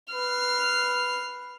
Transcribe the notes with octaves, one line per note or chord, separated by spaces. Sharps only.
B4 F6 C7